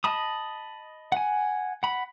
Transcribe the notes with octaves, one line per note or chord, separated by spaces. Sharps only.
D#5 A5 B5 D#6
F#5 G#5
F#5 B5